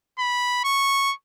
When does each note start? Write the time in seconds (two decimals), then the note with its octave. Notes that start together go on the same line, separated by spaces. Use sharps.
0.19 B5
0.64 C#6